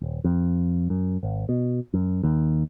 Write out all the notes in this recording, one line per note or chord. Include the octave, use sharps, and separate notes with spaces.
D#1
F2
F#2
G#1
B2
F#2
D#2